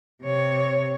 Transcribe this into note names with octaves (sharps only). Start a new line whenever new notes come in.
C3 C#5